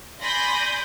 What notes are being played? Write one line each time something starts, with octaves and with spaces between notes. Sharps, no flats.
D5 G#5 B5 C6 G6 A#6